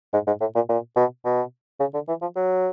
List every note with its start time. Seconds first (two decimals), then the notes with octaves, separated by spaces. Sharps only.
0.13 G#2
0.27 G#2
0.40 A2
0.55 A#2
0.69 A#2
0.96 B2
1.25 B2
1.80 C#3
1.94 D3
2.08 E3
2.22 F3
2.36 F#3